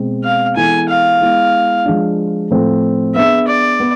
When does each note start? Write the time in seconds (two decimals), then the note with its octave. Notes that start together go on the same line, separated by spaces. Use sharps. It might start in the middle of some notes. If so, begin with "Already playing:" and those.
Already playing: B2 G#3 C4
0.24 F5
0.56 E3 G#3 B3 E4 A4 G#5
0.89 F5
1.21 G#3 B3 E4
1.86 F3 G#3 D4
2.50 A2 F3 A3 C4
3.16 B3 D4 G#4 E5
3.48 D5
3.80 B3